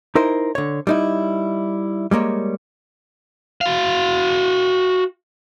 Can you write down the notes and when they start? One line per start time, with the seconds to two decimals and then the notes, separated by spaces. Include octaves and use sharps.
0.15 D#4 E4 A#4 C5
0.55 D3 C#5
0.87 G3 D#4 E4
2.11 G3 G#3 A#3 C#5
3.61 F#4 F5